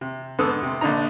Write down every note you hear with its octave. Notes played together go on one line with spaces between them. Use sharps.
C3
G#2 D3 B3 A4 D#6
C3
A#1 D3 D4 D#4 A#5